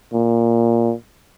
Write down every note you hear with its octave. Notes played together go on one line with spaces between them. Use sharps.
A#2